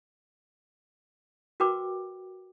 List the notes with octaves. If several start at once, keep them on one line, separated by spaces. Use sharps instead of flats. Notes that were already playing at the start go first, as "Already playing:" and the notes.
F#4 A#4 B4 G5 D6